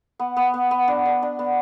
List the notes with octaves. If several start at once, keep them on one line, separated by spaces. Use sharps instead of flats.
B3
B3
B3
B3
D4
D4
D4
B3